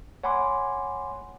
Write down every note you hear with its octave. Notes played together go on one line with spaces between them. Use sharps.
C#5 F#5 G#5 B5 C6 D6